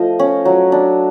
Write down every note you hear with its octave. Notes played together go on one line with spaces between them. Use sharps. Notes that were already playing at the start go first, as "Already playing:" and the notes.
Already playing: F3 A3 F4 D#5
C#4
F#3
D4